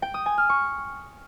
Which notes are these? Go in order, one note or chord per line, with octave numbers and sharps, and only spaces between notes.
G5
D#6
G#5
F6
C#6